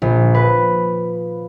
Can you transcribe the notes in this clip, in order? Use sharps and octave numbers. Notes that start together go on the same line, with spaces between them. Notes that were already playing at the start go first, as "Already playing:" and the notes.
A#1
B4